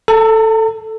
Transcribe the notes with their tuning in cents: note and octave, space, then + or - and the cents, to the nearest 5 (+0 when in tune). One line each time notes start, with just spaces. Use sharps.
A4 +5 A#5 -45